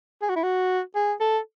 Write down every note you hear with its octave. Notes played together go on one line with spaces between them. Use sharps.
G#4
F#4
E4
F#4
G#4
A4